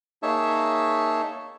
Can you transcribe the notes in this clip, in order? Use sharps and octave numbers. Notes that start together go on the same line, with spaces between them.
A#3 D#4 G#4 C#5 E5 A5